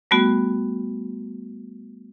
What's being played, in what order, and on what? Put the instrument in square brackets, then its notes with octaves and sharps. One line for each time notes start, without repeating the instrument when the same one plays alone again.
[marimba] G3 A3 B3 F#4